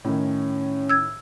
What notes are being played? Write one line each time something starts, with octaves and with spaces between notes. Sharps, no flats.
A2 D#3 C#4
E6 G#6